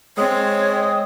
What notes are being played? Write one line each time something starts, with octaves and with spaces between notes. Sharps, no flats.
G#3 C4 C#5 D#6